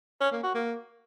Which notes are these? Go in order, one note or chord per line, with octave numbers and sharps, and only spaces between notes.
C#4
A#3
F#4
A#3